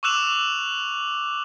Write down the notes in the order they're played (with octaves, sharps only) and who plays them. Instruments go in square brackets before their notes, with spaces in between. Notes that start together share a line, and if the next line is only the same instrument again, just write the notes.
[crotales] C#6 D6 E6 F#6 E7 F7